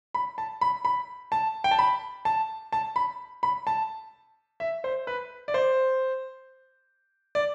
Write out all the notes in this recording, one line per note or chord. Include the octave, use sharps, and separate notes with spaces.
B5
A5
B5
B5
A5
G5
A5
B5
A5
A5
B5
B5
A5
E5
C5
B4
D5
C5
D5